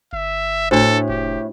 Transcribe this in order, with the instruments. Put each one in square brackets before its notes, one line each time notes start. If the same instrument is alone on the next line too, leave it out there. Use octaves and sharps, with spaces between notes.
[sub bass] G1 [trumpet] E5
[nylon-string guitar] A2 [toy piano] D4 F#4 C5 [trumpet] A4
[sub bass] F1 [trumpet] G4